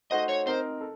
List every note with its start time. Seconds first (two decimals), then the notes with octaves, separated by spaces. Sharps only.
0.11 A3 D#4 F#4 C5 D#5
0.29 C#5
0.46 C4 D#4 A#4 C5
0.81 A4